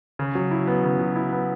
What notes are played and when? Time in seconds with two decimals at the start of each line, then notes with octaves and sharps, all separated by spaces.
0.19 C#3
0.35 F#3
0.51 E4
0.67 B3
0.84 C#3
0.99 F#3
1.16 E4
1.33 B3